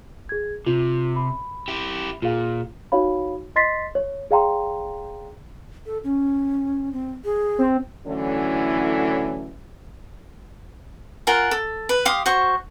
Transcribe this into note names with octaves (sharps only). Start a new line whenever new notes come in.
G#4 G#6
C3 F4
B5
E4 G4
A#2 F4 G#4 F5
D#4 F#4 C#5 F5 B5
D#5 C6 A6 B6 C7
C#5
G#4 D5 F5 G5 A#5 C6
A4
C#4
C4
G#4
C4
A2 D3 E3 F#3 C#4
F4 A#4 F#5 G#5
A4
B4
G4 F5 C6 D#6
F#4 C5 C#6